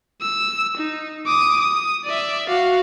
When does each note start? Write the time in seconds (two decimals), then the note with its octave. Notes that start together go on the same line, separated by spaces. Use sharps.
0.21 E6
0.77 D#4
1.27 D6 D#6
1.60 D#6
2.05 D5 E5
2.49 F#4 F5